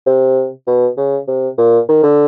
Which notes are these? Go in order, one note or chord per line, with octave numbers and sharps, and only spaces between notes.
C3
B2
C#3
C3
A#2
D#3
D3